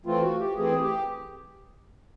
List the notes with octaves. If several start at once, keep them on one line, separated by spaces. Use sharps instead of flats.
E3 A3 C4 F4
F#4
G4
E3 A3 C4 G#4
G4